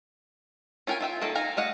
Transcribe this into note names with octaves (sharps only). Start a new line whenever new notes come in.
C#4 F4 A#4 G5 G#5
F4 E5 G5
D#3 A#3 A4
D#4 F5 G#5 A#5
A3 D#5 F5 F#5